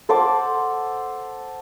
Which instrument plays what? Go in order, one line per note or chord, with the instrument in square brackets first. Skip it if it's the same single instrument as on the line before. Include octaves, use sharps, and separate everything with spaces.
[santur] A4 C5 F#5 D6